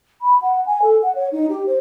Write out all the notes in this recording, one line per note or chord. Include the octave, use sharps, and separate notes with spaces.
B5
F#5
G#5
A4
F#5
C#5
D#4
G4
C5